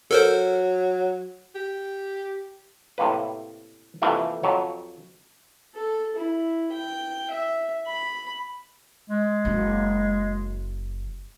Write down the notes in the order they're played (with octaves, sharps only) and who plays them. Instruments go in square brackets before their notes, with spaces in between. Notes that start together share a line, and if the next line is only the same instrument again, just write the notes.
[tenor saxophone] F#3 [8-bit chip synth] A4 A#4 C5
[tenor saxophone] G4
[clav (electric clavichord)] A2 C3 A#3 B4
F2 C3 E3 A3 A#3
F2 F#3 C#5
[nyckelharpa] A4
E4
G5
E5
B5
[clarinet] G#3
[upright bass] F#1 F#3